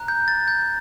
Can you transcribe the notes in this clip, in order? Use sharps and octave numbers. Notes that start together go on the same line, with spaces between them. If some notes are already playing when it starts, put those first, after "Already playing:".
Already playing: A#5 F#6
G6
A6
G6